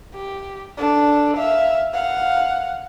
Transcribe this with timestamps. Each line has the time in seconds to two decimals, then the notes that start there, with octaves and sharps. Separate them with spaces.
0.14 G4
0.77 D4 A4
1.37 E5 F5
1.93 F5 F#5